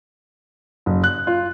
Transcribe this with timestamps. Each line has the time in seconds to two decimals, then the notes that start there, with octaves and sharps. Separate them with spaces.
0.86 F#1
1.04 F#6
1.27 F4